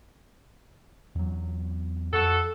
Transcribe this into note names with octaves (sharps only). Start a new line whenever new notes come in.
E2 F#3
F2 F#4 A4